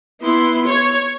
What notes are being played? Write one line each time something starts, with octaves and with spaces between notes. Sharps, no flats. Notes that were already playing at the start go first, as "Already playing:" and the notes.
B3 E4 C6
C#5